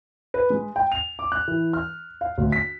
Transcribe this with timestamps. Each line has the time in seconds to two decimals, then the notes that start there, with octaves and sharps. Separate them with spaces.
0.34 B4
0.50 G#3
0.76 G5
0.92 F7
1.19 D6
1.32 F#6
1.48 E3
1.73 F6
2.21 F5
2.38 D2
2.52 B6